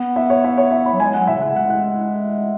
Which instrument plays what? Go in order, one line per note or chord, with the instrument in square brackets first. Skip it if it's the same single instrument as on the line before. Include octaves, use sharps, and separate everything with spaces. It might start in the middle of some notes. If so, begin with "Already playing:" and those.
Already playing: [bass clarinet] B3
[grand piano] E5
C#5
E5
C#5
E5
B5
[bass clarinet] F#3
[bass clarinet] G#3 [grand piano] G#5
[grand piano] F#5
[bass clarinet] F#3
[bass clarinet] B2 [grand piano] E5
[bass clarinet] C#3 [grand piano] F#5
[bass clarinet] G#3 [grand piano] F#5
[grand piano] F#5